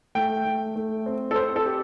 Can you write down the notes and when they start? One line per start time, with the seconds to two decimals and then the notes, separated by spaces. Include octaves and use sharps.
0.15 A3 G5
0.45 A3
0.76 A3
1.06 C4
1.31 A4
1.36 C4 C5
1.56 A4
1.66 G4